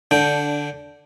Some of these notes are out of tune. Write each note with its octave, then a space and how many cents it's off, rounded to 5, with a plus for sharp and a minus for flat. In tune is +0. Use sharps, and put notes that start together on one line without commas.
D3 +0 D4 -15 G5 +0